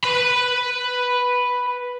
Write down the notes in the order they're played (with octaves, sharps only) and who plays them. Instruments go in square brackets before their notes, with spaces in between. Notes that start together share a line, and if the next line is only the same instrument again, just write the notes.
[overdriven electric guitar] B4 B5